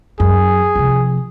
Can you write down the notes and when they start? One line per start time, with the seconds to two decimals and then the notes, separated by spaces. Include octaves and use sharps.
0.20 F#2 G#4
0.75 C3 F3